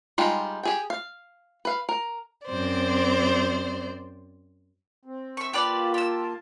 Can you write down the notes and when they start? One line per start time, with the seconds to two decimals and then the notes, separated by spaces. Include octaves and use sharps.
0.18 G3 G#3 D#4 F4 G4
0.63 G4 G#4 G5
0.90 F5
1.65 B4 F5
1.89 A#4
2.46 F#2 C4 C5 D5
5.05 C4
5.37 E5 C#6
5.53 A#3 F4 G4 B4 D5 A5
5.94 G4 E6